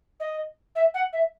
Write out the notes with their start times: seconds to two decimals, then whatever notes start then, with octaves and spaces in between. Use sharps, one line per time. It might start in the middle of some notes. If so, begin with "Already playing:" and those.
0.19 D#5
0.75 E5
0.94 F#5
1.12 E5